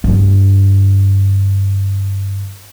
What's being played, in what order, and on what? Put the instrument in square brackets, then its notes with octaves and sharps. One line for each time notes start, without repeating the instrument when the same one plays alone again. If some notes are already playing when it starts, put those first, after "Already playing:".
[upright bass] G2 D3